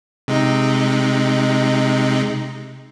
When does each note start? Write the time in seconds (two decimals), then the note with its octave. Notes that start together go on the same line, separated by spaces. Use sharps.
0.28 C3 G#3 D#4